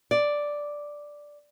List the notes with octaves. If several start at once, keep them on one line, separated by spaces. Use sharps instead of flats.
D5